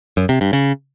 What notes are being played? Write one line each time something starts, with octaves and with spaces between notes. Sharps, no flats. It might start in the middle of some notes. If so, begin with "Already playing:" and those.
F#2
C3
G2
C#3